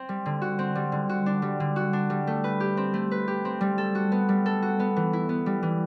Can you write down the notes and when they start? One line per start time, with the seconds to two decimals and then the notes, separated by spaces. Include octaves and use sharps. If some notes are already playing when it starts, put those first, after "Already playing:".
Already playing: C4
0.09 G3
0.26 D3
0.42 F#4
0.59 C4
0.75 G3
0.92 D3
1.09 F#4
1.26 D4
1.42 G3
1.60 D3
1.76 F#4
1.93 D4
2.10 G3
2.27 A3
2.44 B4
2.60 G4
2.77 C4
2.94 A3
3.11 B4
3.28 G4
3.45 C4
3.61 G3
3.78 A4
3.95 F#4
4.12 B3
4.29 G3
4.46 A4
4.62 F#4
4.80 B3
4.96 E3
5.13 E4
5.29 B3
5.46 G3
5.63 E3